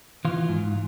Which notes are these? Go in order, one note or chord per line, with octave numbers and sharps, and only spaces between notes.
E3 F4
G#2